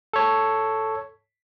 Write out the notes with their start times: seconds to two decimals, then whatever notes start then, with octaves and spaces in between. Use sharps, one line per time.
0.13 A4 C#5